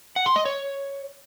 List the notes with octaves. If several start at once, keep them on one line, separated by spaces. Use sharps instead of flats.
F#5
C6
D#5
C#5